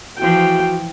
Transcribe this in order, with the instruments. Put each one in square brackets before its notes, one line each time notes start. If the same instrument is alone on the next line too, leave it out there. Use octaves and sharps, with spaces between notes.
[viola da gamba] E3 F3 [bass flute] F#4 [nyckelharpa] G5